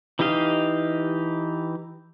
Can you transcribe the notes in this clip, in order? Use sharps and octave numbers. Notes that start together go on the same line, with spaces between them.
E3 D#4 G4 D#5 F5